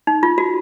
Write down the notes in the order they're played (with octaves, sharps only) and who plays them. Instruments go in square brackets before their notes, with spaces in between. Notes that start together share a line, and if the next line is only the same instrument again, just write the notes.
[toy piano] D#4
F4
F#4